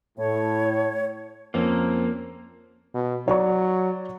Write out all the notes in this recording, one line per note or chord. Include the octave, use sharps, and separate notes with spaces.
A2 C#5
F2 A#3 C4 C#4
B2
F#3 C#5 D5 C#6